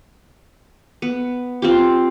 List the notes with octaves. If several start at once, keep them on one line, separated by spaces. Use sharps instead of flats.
B3
C4 F4 G4